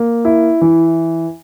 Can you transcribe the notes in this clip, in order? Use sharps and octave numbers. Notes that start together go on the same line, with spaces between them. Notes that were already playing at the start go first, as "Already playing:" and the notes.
Already playing: A#3
E4
E3